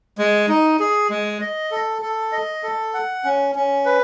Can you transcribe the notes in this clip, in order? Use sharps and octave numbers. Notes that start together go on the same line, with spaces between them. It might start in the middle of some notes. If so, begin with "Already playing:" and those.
G#3
D#4
G#4
G#3
D#5
A4
A4
D#5
A4
F#5
C#4
C#4
B4